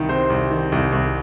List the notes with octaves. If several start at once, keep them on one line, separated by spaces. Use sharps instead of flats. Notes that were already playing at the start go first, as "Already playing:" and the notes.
Already playing: C2 D#3
C3 C5
C2
D#3
C2
C2